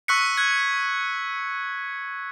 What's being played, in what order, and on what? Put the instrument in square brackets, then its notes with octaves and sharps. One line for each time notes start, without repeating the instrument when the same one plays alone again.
[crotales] C#6 E6 F#6 B6 C#7
F#6 G#6